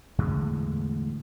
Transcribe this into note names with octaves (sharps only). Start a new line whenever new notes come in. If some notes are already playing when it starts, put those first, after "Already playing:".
E2 A2 D3 G#3